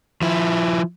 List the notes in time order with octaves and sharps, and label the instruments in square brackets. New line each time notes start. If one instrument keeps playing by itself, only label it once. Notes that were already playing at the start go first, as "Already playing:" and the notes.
[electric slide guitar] F3 E4